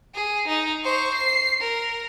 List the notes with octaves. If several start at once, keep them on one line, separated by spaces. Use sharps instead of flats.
G#4
D#4
C5 C#6
C7
A#4